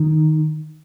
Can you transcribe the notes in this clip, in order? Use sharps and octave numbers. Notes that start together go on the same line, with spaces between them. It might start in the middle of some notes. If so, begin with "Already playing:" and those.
Already playing: D#3